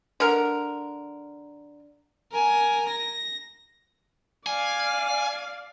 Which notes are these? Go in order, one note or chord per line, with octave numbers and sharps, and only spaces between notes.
D3 A#4
A#4 G#5
A#6
D5 F5 G#5